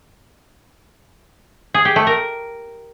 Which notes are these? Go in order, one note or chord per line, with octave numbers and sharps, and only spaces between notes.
G#4
G4
A3
A#4